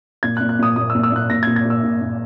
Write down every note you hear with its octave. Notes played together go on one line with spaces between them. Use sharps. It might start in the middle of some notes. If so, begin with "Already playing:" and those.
A#2 G#6
F#6
A#2
F#6
A#2 D#6
A#2 D#6
E6
A#2
E6
A#2 F#6
A#2 A#6
A#2 G#6
G#6
A#2
E6
A#2
A#2